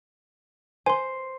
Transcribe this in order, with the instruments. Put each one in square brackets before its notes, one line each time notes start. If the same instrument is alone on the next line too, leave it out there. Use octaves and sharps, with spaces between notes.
[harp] C5 [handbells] G#5 C6